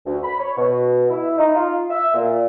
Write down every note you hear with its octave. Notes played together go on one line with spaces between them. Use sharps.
D2
B5
C#5
B2
E4
D#4
F4
E5
A#2